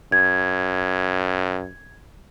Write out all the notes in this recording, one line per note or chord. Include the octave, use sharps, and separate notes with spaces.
F#2 G#6